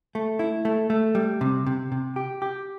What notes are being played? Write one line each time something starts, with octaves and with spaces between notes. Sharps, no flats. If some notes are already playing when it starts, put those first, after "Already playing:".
A3
E4
A3
A3
G3
C3
C3
C3
G4
G4